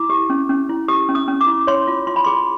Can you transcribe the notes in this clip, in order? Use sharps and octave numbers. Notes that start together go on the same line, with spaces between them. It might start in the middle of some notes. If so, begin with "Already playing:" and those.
Already playing: E4 D6
G4
C#4
C#4
E4
G4 D#6
C#4
D#6
C#4
D6
E4
C#5 C6
F4
F4 C6
B5
G#4 C6